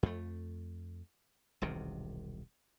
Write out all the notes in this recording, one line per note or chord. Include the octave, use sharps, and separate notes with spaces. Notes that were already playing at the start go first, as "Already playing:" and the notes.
F2 A3
E1 C2 C3 D#3